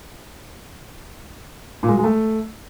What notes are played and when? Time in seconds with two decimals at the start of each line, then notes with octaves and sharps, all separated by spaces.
1.83 A#2
1.88 G#3
1.93 F#3
1.99 G#3
2.04 A3